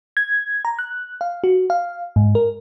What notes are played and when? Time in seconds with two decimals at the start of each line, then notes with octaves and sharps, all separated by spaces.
0.17 G#6
0.65 A#5
0.79 F#6
1.21 F5
1.44 F#4
1.70 F5
2.16 G#2
2.35 A#4